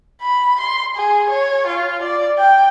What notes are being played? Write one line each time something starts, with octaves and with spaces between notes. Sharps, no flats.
B5
C6
G#4
C#5
F4
D5
G5